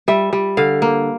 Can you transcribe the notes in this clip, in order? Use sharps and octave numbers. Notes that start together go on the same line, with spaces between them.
G3 E5
G3
D3 F5
A#3